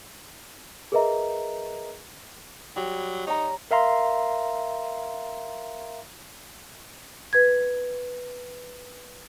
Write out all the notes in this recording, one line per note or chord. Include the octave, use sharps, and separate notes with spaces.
G#4 A#4 B4 D#5 E5 A#5
F#3 G3
D#4 C#5 A#5
A#4 E5 F5 A#5 C6
B4 G#6